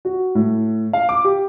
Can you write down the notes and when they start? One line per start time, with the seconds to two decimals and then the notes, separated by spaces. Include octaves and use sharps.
0.05 F#4
0.35 A2
0.93 F5
1.09 D6
1.24 G4